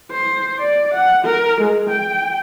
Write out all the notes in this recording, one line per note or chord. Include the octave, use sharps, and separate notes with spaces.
C5
D5
F#5
A#4
G#3
G5